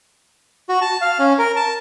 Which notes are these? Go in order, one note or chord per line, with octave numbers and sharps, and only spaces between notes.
F#4
A5
F5
C#4
A#4
A5